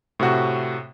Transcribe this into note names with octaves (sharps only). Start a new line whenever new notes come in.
A2 C3 F#4